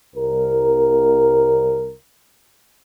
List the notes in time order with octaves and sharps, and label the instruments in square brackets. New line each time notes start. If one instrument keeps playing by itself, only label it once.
[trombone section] C2 A#4